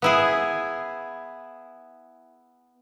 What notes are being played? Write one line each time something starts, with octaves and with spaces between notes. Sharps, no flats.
B3 E4 G#4